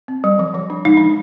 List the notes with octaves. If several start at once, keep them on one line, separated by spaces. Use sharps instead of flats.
C4
G3
F3
F3
D4
G#3 D#4
F3 D4